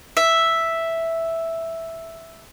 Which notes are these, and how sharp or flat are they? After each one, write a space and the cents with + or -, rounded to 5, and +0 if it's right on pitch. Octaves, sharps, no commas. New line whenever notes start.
E5 +0